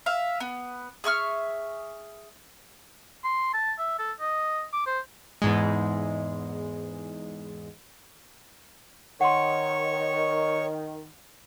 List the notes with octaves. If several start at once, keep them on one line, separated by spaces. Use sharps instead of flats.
E5 F5
B3
G#4 E5 C#6 F6
C6
A5
E5
A4
D#5
D6
C5
E2 G#2 G#3
D#3 C#5 F#5 C6 C#6